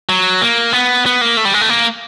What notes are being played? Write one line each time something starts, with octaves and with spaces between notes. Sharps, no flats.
F#3
A#3
B3
B3
A#3
A3
G3
G#3
A3
A#3